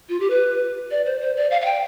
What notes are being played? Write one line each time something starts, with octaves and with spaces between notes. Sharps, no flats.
F4
G4
B4
D5
C5
C5
D5
F5
F5
G5